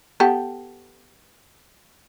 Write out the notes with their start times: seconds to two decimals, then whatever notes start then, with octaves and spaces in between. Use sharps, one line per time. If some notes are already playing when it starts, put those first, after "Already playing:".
0.20 B3 G4 A4